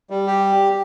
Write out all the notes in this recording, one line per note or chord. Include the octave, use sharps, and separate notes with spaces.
G3
G4